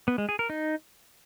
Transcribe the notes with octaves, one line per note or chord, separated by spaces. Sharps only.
B3
G#3
G#4
A#4
D#4